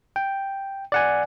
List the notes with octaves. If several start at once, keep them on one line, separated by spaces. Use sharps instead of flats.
G5
D5 F#5 G#5